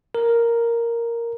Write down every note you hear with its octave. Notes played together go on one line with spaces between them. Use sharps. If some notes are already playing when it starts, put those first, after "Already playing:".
A#4